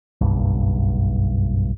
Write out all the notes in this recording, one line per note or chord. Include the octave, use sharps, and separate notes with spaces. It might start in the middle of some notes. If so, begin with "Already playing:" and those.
F#1 B1 G2